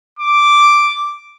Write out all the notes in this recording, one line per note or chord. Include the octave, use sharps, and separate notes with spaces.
D6